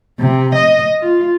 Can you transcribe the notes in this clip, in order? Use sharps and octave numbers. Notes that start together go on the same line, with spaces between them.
C3
D#5
F4